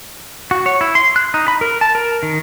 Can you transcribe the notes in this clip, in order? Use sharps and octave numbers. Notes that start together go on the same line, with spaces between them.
F#4
C#5
E4
C6
F#6
D#4
B5
A#4
A5
A#4
D#3